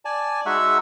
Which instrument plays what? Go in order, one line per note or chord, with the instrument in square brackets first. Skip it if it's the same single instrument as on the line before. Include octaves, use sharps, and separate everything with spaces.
[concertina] D5 G#5 A5
G#3 D#4 F#4 E5 F#5 E6